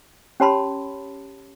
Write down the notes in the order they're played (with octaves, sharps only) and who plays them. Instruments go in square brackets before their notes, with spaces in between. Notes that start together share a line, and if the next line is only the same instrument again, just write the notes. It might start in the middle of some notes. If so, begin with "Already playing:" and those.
[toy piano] C#4 G4 C#5 A5 B5 C6